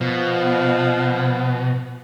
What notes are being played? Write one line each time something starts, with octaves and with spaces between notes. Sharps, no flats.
B2 F3